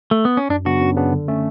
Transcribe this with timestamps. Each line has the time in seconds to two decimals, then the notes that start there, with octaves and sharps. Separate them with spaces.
0.11 A3
0.25 B3
0.37 C#4
0.49 F#2 D4
0.65 C#3 F#3 B3 D4 F#4
0.81 F#2
0.96 C#3 F#3 B3 D4
1.12 D3
1.28 A3 C#4